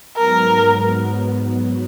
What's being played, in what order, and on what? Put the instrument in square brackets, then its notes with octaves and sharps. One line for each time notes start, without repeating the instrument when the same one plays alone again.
[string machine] G#2 F#3 B3 [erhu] A#4